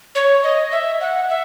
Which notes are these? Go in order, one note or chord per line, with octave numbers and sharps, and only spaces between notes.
C#5
D#5
E5
F#5
E5